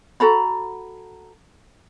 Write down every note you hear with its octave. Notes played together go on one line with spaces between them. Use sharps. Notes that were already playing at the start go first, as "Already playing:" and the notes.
F#4 A4 A#5 B5